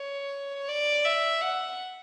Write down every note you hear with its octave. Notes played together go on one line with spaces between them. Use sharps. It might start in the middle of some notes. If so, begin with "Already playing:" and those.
Already playing: C#5
D5
E5
F#5